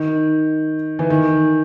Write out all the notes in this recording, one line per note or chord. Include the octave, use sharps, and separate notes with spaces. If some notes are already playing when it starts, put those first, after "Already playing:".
Already playing: D#3
E3
D#3